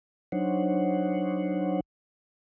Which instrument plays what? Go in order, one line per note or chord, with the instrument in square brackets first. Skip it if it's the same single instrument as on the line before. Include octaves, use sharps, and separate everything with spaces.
[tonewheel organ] F#3 D4 D#4 C5 C#5 F#5